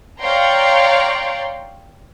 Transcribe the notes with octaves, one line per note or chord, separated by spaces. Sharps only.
C#5 D5 F5 G5 A#5 C6